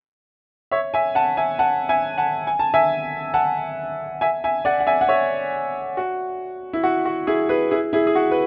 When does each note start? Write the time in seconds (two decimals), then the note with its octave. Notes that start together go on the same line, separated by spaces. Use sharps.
0.71 C#5 E5
0.94 E5 G#5
1.15 F#5 A5
1.37 E5 G#5
1.59 F#5 A5
1.89 E5 G#5
2.18 F#5 A5
2.47 G#5
2.59 A5
2.74 E5 G#5
3.34 F#5 A5
4.21 E5 G#5
4.44 E5 G#5
4.65 D5 F#5
4.80 F#5
4.87 E5 G#5
5.01 F#5
5.09 C#5 E5
5.97 F#4
6.73 E4
6.84 F#4
7.06 F#4
7.27 E4 G#4
7.49 G#4 B4
7.71 E4 G#4
7.93 E4 G#4
8.07 G#4
8.15 F#4
8.31 B4